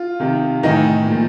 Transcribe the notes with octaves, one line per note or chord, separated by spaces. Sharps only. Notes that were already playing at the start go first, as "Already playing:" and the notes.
Already playing: F4
C3 D#3
A2 D#3 E3 D#4
A#2 F3